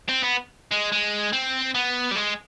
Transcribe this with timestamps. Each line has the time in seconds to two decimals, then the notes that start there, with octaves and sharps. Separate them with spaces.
0.09 C4
0.23 B3
0.71 G#3
0.92 G#3
1.33 C4
1.75 B3
2.11 G3
2.16 G#3